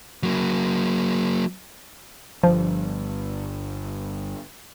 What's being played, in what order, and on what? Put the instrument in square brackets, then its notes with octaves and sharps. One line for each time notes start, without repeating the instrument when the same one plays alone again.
[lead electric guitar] F#3 A#3
[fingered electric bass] G1 G2 [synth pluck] F3